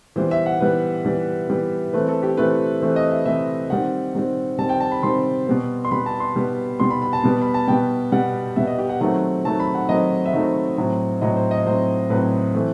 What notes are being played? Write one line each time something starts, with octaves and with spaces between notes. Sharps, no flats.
E3 G3 B3 C5
E5
F#5
E3 G3 B3 B4
E3 G3 B3
E3 G3 B3
E3 A3 C4 B4
A4
G4
E3 A3 C4 B4
E3 A3 C4 C5
D#5
E5
E3 A3 C4 E5
D#3 G3 C4 F#5
D#3 G3 C4
D#3 G3 C4 A5
G5
A5
B5
D#3 G3 C4 C6
B2 G3 B3
C6
B2 G3 B3 B5
A5
C6
B2 G3 B3
B2 G3 B3 C6
B5
B5
A5
B2 G3 B3
B5
A5
B2 G3 B3 G5
B2 G3 B3 F#5
B2 G3 B3 E5
D#5
G4
F#5
D#3 F#3 A3 C4 F#5
D#3 F#3 A3 C4 A5
B5
F#5
D#3 F#3 A3 C4 D#5
E5
D#3 F#3 A3 C4 D#5
A2 F#3 C4
A2 F#3 C4 D#5
C5
D#5
A2 F#3 C4 C5
A2 F#3 C4 B4
E3 A3 C4